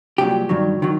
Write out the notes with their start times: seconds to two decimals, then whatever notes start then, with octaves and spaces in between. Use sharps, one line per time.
0.18 C2 A#2 F#3 G4
0.49 G2 D#3 F#3
0.82 D#3 F#3